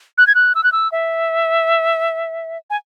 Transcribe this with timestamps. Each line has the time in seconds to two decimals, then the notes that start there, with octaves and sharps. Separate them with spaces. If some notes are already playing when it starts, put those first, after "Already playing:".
0.18 F#6
0.27 G#6
0.35 F#6
0.55 E6
0.64 F#6
0.72 E6
0.92 E5
2.70 G#5